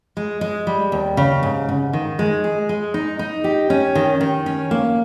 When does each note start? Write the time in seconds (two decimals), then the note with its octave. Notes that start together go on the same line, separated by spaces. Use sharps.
0.17 G#3
0.41 G#3
0.67 G3
0.92 D#2
1.17 C#3
1.43 G#2
1.69 G#2
1.93 D#3
2.19 G#3
2.44 G#4
2.69 G#3
2.94 D#4
3.19 D#4
3.44 G4
3.70 C#4
3.95 D#3
4.21 D#3
4.46 C#4
4.71 A#3